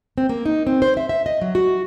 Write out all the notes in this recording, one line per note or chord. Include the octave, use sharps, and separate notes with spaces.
C4
A#3
D#4
C4
C5
E5
E5
D#5
F#3
F#4